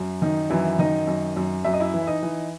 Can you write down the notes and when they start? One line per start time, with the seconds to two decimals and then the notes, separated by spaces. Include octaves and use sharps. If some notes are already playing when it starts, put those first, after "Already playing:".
Already playing: F#2
0.22 D#3 D#4
0.50 F#2 E3 E4
0.79 D#3 D#4 D#5
1.07 F#2
1.37 F#2
1.64 F#2 E5
1.73 D#5
1.80 E4 E5
1.94 E3
2.02 E5
2.07 D#4 D#5
2.23 E3